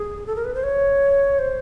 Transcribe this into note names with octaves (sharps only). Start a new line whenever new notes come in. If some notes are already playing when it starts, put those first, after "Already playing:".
Already playing: G#4
A4
A#4
B4
C5
C#5
C5